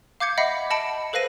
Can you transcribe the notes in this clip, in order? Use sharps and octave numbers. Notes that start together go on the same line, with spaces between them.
F5 D6 G6 G#6 C#7
D#5 E5 F#5 B5 C7 C#7
D#5 A5 B5 C#7 D7
A4 B4 C5 F5 A#6 D#7